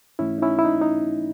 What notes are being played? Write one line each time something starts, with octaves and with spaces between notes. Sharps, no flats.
G#2 E3 A3 C#4 E4
D#4
C#4 E4
E4
D#4
D#4